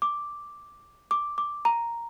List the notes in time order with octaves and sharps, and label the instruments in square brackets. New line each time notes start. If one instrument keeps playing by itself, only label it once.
[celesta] D6
D6
D6
A#5